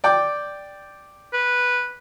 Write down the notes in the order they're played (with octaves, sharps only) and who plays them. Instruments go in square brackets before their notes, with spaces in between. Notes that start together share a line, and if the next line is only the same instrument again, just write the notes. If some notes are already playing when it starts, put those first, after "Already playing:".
[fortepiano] D5 G5 D6
[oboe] B4